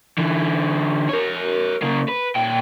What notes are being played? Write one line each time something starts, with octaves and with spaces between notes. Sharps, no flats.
D3 E3
A#4 C#5
C#3 A#3
B4
A#2 G5